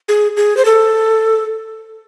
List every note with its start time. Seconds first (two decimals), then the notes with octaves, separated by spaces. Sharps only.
0.08 G#4
0.37 G#4
0.57 C5
0.65 A4